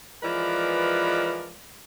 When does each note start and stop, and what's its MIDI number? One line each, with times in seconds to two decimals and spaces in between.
0.23 1.55 52
0.23 1.55 53
0.23 1.55 56
0.23 1.55 70
0.23 1.55 71
0.23 1.55 74